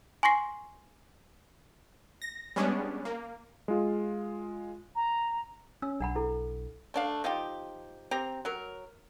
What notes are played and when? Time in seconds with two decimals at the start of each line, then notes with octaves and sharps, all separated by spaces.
0.23 G#5 C6 C#6 A#6 C7
2.22 A#6
2.56 G3 G#3 B3 C#4 D4
3.05 A#3
3.68 G#3 F4
4.95 A#5
5.82 C#4 E6
6.00 B1 D4 F#5 B5
6.15 E4 A4
6.94 A3 D4 F5
7.24 F3 D#4 F4 G4
8.11 C4 G4 A#5
8.45 F#3 A#4